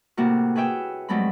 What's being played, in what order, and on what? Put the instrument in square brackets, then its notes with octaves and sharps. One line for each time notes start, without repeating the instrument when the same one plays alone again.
[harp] A2 C3 A#3 E4 F#4
G#4 B4 C#5 E5 G5 E6
G2 F#3 G#3 A3 C4 B5